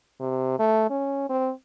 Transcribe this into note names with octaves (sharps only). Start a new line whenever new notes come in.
C3
A3
C#4
C4